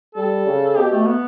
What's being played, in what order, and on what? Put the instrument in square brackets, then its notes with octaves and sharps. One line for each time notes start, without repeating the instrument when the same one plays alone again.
[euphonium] G3 [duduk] A4
[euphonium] C#3
[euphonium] B2 [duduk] G4
[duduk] A3
B3